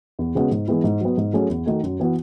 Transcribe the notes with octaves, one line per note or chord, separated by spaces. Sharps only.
E2
C#3 G#3 B3 F#4
G#2
E3 G#3 B3 E4
G#2
F#3 B3
G#2
F#3 A3 C#4 G#4
E2
D#3 A3 D#4 F#4
F#2
E3 B3 F#4